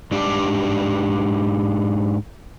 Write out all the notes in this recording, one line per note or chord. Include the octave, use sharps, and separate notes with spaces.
G#2 D4 G4 D5